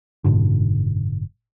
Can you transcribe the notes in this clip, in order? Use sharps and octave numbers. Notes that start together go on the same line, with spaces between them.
F#1 G#2 B2 D3